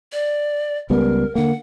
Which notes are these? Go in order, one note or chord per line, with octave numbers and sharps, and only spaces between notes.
D5
C#2 G3 B3 A#4
D3 A#3 F#5